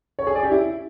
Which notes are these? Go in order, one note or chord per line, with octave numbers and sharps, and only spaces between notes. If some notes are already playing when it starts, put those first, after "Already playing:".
C#5
G#4
D5
G4
E4